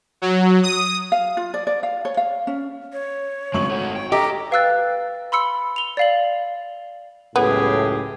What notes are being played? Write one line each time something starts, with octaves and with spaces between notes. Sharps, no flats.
F#3
D#6
F5
F4
D5
D5
F5
C#5
F5
C#4
C#5
G#1 G2 C#3 C#6 F#7
A3 F#4
G5
G4 A4 D#5 A#5
B4 F5 G5 E6 F#6 A6
B5 C6 E6 C#7
F7 G7
D5 F5 F#7
C#2 F#2 A2 B3 G4 G#4